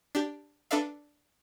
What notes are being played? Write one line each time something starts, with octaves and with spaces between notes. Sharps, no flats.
D4 G4
D4 A4 B4 D5 E5 F5